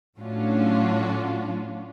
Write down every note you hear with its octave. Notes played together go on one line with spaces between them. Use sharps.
A2 F#3 C#4 D4 F4 F#4